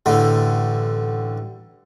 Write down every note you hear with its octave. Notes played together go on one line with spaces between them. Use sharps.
A1 D3